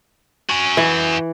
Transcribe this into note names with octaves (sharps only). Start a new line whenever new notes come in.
F#4 G#5
E3